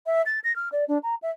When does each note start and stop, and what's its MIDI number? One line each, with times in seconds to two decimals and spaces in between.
0.06 0.22 76
0.26 0.39 93
0.44 0.55 94
0.56 0.69 89
0.72 0.85 74
0.88 0.98 62
1.03 1.15 82
1.22 1.30 76